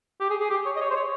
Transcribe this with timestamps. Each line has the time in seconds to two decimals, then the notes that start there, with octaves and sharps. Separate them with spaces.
0.20 G4
0.30 G#4
0.40 G#4
0.50 G4
0.65 C#5
0.76 D#5
0.81 C#5
0.91 C5
0.96 C#5